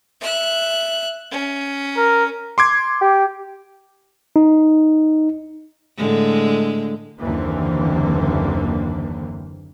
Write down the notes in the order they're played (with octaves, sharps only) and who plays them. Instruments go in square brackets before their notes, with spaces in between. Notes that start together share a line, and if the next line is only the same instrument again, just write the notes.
[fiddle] E5 F#6
C#4
[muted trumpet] A#4
[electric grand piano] C6 D6 G#6
[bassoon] G4
[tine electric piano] D#4
[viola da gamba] A2 D3 G#3
[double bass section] F#1 D#2 D3 E3 A#3 C4